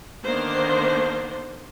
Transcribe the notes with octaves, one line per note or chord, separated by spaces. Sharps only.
D3 D#3 A#3 B3 D4 C5